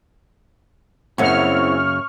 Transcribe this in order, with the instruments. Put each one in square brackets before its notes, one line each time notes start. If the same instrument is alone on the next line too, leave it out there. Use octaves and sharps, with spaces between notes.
[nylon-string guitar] F#2 C#3 A#3 [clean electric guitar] C4 E4 G#4 [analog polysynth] C#6 F6